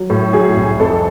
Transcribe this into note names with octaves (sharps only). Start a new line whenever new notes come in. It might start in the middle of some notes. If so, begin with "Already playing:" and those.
Already playing: F#3
A2
F#3 G#4
C2
F2 A4